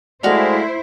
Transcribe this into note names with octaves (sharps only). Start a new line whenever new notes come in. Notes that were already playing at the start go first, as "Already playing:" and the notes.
G#3 A3 E4 F#4 C5 D5 F5